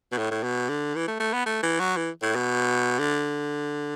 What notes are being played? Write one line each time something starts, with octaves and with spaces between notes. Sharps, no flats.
B2
A2
A2
B2
D3
E3
A3
A3
B3
A3
E3
F#3
E3
A2
B2
D3